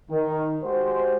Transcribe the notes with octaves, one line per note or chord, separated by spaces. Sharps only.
D#3
G#3 F#4 G4 C5